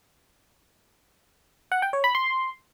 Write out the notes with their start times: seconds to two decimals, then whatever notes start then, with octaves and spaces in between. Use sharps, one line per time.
1.72 F#5
1.82 G5
1.93 C#5
2.04 B5
2.15 C6